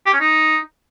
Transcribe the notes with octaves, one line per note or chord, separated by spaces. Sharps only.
G4
C#4
D#4